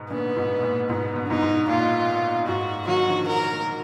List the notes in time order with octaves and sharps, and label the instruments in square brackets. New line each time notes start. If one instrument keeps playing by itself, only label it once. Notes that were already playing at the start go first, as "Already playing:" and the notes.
Already playing: [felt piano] G#2 B2
[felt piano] A#2 D3 [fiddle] B3
[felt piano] G#2 B2
A#2
[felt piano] G#2 B2 [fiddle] B3
[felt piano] B2
D3
[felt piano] G#2 B2 [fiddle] D#4
[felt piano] G#2
[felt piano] A#2 [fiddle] F4
[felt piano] G#2 [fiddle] F#4
[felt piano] D#3 F#3 [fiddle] F#4
[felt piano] D3 F3
[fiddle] A#4